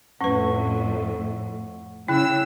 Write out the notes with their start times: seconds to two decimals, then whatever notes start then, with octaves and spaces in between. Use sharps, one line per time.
0.21 F2 A2 C#4 B4 F#5 C#6
2.08 C#3 E4 G5 E6 F#6